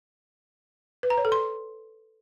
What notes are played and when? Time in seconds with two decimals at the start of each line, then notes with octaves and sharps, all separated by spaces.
1.03 B4
1.10 A#5
1.18 C#5
1.25 A4
1.32 C6